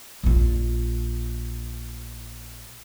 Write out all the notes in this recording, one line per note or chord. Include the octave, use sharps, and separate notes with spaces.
A#1 F4